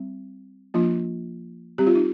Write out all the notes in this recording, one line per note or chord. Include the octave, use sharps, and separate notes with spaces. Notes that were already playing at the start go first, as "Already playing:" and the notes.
Already playing: G3 C4
F3 A#3 D4 F4
G3 C4 G4
F4
D#4